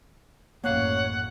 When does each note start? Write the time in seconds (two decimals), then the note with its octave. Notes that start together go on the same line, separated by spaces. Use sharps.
0.64 A1 F#2 A2 A#3 C#5 F5 F#5